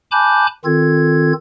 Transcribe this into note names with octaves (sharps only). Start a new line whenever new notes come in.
G#5 A5 B5 D6 F#6 G6
D#3 C4 F4 A4 G#6